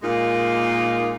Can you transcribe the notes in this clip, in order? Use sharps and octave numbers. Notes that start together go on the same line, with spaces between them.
A#2 G#3 A#3 D#4 F4